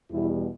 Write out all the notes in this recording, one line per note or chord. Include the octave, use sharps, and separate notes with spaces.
E2 B2 G3 E4